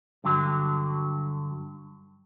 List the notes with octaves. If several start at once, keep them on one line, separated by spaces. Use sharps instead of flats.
G2 D3 F#3